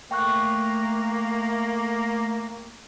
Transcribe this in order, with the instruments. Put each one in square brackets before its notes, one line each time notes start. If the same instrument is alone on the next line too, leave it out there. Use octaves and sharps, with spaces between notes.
[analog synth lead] A3 [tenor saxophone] A#3 [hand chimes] G5 C#6 F#6